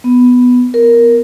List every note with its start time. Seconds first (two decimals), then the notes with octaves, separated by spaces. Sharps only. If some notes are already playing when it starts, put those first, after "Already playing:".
0.04 B3
0.74 A#4